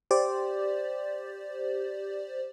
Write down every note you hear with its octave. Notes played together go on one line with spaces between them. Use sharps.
G4 C5 D5